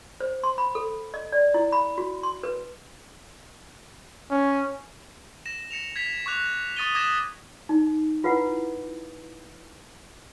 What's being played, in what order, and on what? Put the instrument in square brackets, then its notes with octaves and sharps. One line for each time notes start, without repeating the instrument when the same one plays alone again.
[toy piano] C5
C6
B5
A4
D#5
D5
E4
B5
F#4
C6
B4
[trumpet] C#4
[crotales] A#6 E7
A#6 C#7 E7 F7
G#6 B6 F7
C#6 D6 F#6 F7
C#6 D#6 A6 D#7 G7
D6 D#6 G#6 A#6 E7
[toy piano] D#4
E4 F4 B4 F5 F#5